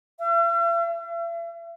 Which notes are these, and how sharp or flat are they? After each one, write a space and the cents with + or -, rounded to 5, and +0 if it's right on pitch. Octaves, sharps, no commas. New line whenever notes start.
E5 +45
E5 +45